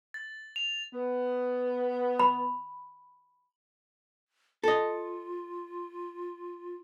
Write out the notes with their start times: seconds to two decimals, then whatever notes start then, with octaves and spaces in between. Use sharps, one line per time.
0.14 A6
0.56 F7
0.93 B3
2.19 B5
4.63 F4 A4 D#5